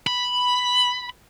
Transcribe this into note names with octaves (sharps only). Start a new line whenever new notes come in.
B5